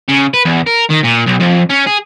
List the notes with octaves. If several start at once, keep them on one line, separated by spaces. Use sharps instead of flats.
C#3
B4
E2
A#4
D#3
A#2
B1
F2
C#4
G#4